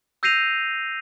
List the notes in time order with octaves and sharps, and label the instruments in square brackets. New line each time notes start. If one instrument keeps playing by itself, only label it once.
[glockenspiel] E6 G6 A#6 C7 D#7 F7